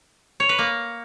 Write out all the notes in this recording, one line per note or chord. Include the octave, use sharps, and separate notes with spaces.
C#5
B4
A#3